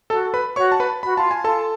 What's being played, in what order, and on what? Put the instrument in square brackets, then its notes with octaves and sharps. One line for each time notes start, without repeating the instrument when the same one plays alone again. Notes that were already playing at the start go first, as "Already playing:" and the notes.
[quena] F#4 [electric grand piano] A4 A5
[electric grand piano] B4 B5
[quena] F#4 [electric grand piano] C#5 C#6
[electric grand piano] A5
B4 B5
[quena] F#4 [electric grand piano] B5
[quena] F4 [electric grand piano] A5
[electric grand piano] G#5
[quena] F4 [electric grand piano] A4 A5